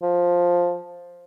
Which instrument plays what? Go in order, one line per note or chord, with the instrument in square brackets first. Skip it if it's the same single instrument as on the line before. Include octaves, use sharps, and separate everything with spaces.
[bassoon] F3